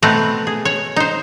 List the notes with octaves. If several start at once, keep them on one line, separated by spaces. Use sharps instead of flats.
B2 A3 C4 B4 A#5
G#4
C#5
D#4 C5